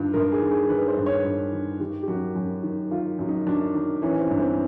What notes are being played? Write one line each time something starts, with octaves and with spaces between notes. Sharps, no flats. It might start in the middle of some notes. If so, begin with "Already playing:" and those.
Already playing: G2 D#3 F4
G2 A#4
G#4
D#3
G#4
D#3 B4
C5
G2
C#5
G2
D#3
D#3 G4
G4
F#2 F#4
F#2
D#3
D#3 F4
F#2
D#4
F#2 D4
D#3
E3 C#4
C4
G2
C4